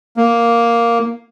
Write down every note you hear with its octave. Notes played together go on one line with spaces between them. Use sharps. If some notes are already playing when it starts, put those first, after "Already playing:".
A#3